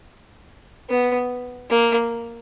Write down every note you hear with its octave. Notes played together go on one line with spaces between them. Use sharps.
B3
A#3